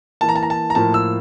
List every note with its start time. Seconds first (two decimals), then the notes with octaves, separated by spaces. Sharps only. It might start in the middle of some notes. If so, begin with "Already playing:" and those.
0.21 E3 A#3 A5
0.29 A#5
0.36 A5
0.43 A#5
0.50 A5
0.70 A#5
0.75 A2 F3 A#3 A5
0.94 E6